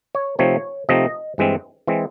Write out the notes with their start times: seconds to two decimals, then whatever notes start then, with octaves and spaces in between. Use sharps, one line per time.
0.15 C#5
0.39 C3 F3 A3 C4 D#4 C#5
0.89 C3 F3 A3 C4 D#4 D#5
1.38 G2 E3 G#3 C4
1.87 E3 G#3 C4